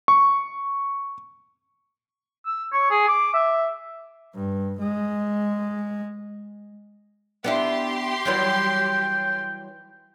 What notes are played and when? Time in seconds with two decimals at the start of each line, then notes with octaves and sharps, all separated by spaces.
0.08 C#6
2.46 E6
2.73 C#5
2.91 G#4
3.08 D6
3.34 E5
4.35 G2
4.79 G#3
7.44 B3 D4 E4 G4 C6
8.25 E3 F#3 G3 G5